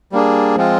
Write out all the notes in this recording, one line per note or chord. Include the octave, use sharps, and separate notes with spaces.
G3 A#3 D4 G#4
F3 G#3 C4 F4